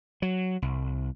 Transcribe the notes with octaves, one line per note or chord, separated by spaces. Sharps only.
F#3
C2